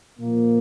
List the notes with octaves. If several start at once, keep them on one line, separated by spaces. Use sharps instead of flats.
A#2 F3 A#3